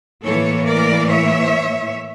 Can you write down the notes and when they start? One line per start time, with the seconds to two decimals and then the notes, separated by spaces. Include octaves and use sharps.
0.25 A2 E3 A#3 A4 C#5
0.67 A#4 D5
1.10 C#5 E5